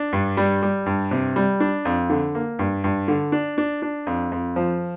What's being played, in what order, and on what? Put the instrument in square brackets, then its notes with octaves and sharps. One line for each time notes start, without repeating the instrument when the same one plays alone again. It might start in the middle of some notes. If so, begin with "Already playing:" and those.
Already playing: [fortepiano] D4
G2
G3
G3
G2
C3
G3
D4
F2
D3
A#3
G2
G2
D3
D4
D4
D4
F2
F2
F3